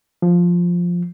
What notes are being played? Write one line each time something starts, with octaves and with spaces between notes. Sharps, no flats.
F3